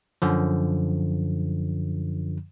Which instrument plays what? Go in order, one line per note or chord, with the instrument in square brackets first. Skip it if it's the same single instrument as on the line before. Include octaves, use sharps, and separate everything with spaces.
[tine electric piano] F#2 D3 F3